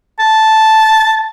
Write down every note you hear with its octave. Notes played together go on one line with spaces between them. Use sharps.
A5